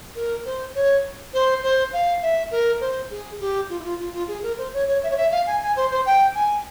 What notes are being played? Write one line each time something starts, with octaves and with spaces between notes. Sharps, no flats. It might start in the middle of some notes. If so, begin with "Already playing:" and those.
A#4
C5
C#5
C5
C5
F5
E5
A#4
C5
G#4
G4
F4
E4
F4
F4
F4
G#4
A#4
C5
C#5
C#5
E5
C#5
E5
F5
G#5
G#5
C5
C5
G5
G#5